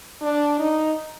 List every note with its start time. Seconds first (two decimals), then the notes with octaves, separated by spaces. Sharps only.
0.21 D4
0.59 D#4